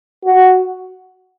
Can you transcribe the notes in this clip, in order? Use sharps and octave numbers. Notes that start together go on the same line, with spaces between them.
F#4